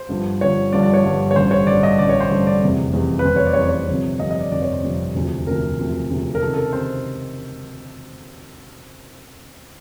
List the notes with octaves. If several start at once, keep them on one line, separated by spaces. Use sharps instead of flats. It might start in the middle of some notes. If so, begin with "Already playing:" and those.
Already playing: C5
G1 G2 D3 F3
G1 G2 D3 F3 C#5
G1 G2 D3 F3 D5
D5
C#5
G1 G2 D3 F3
C#5
A1 G2 D3 C5
C#5
A1 G2 D3 D5
D#5
A1 G2 D3 D5
C#5
C5
A1 G2 D3
D5
F1 E2 C3
F1 E2 C3
B4
F1 E2 C3 C5
C#5
D5
C#5
F1 E2 C3 C5
C#5
G1 F2 C3
G1 F2 C3 D#5
D#5
D5
G1 F2 C3 D5
C#5
C5
G1 F2 C3
E1 D2 C3 F3
E1 D2 C3 F3 A#4
E1 D2 C3 F3
E1 D2 C3 F3
A#4
C#2 C3 D#3 A4
A4
A#4
C3 D#3 C5